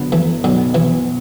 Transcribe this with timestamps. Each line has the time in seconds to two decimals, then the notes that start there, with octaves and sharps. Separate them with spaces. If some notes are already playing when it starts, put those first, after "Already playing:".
Already playing: F#1 F#2 D3 B3 F#4
0.12 E3 A3
0.44 B1 B2 D3 F#3 B3
0.74 B2 E3